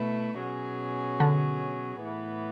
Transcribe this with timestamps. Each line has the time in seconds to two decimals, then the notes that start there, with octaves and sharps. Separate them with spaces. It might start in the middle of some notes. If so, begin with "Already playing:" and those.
Already playing: B2 A3 E4 B4
0.40 B2 F#3 C#4 G#4
1.20 D3
2.01 A2 E3 B3